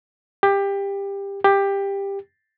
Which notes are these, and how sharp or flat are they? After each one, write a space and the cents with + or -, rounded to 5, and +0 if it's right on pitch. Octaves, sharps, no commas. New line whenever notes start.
G4 +20
G4 +15